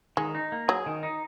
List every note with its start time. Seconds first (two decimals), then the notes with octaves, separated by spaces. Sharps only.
0.17 D#3 G#3
0.35 D#4
0.52 A#3
0.68 F#3 G#4
0.86 D#3
1.03 D#4